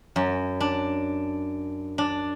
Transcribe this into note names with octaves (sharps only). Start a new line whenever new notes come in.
F#2
D4
D4